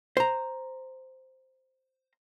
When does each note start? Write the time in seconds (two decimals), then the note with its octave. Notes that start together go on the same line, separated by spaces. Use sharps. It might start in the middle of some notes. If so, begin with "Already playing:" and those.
0.17 C5 A#5